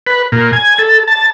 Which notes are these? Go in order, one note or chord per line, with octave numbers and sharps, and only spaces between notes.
B4
A#2
G#5
A4
A5